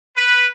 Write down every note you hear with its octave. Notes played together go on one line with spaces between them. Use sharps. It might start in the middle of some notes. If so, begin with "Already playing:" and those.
B4